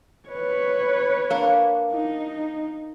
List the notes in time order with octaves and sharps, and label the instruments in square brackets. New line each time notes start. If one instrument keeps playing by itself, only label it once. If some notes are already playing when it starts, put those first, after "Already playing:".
[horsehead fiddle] B4 C#5
[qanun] A#3 D4
[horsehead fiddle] D#4